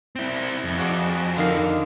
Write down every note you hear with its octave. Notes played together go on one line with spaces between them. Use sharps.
C4 E4
F2
F#4 G#4 D5
D3 D#3 F5